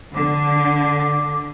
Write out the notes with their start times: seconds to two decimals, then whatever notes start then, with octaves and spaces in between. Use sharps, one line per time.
0.14 D3 D6